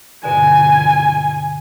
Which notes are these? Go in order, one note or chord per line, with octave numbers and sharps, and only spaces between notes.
G2 B2 D3 G#5